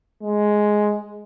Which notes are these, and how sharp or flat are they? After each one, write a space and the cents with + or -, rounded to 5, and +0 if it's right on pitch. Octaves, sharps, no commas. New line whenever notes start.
G#3 +5